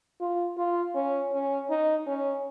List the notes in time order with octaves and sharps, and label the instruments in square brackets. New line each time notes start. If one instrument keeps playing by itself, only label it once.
[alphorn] F4
F4
C#4
C#4
D#4
C#4